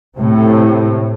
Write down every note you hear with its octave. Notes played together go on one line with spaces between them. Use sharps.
A2 C3